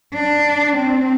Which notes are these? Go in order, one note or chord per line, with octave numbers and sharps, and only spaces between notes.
D4
C4